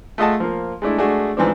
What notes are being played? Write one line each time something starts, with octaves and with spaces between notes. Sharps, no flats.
A3 F4 G#4 D#5 F#5 A5
F3 A#3
G#3 A3 D4 E4
G#3 A3 D4 F#4 G#4
G#2 E3 F3 C4 D4